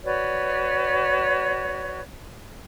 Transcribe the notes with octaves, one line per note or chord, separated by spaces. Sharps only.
F#4 B4 C#5 D5